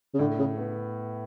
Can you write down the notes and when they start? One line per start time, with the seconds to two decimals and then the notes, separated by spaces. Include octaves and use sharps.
0.14 C#3
0.19 A2 D3
0.39 C#3
0.58 B3